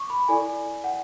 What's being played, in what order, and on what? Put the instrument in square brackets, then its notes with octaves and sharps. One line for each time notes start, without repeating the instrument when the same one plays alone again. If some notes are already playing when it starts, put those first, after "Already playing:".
Already playing: [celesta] C#6 D6
B5
E4 A4 D5 G#5
F#5